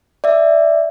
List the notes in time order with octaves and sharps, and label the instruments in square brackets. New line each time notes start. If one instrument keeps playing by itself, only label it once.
[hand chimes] D5 E5